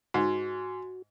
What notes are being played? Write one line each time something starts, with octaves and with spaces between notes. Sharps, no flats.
G#2 F#4